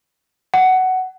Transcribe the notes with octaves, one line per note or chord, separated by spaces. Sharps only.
F#5